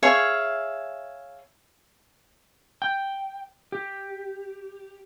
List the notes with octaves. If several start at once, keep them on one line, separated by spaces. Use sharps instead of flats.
G#4 C#5 E5 F5
G5
G4